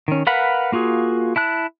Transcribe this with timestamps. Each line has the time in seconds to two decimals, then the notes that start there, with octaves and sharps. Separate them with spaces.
0.08 D#3 C#4
0.27 A#4 B4 F5 F#5 B5
0.72 A#3 F4 F#4 G#4
1.36 E4 A5 F#6